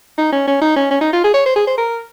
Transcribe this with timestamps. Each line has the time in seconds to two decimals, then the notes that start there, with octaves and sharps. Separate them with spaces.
0.18 D#4
0.32 C#4
0.47 C#4
0.61 D#4
0.76 C#4
0.91 C#4
1.01 D#4
1.13 F4
1.24 G#4
1.34 C#5
1.46 C5
1.56 G#4
1.67 C5
1.78 A#4